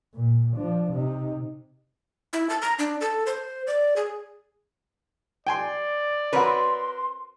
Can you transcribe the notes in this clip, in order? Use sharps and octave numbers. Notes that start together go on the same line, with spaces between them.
A#2
F3 D4
C3 D#4
E4
A5
A#5
D4
A4
C5
D5
G#4
D5 G5 G#5 C6
C4 F#4 A#4 B4 C#5 C6